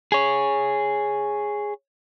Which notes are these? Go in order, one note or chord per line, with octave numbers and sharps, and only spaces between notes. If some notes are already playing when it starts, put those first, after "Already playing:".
G#4 C#5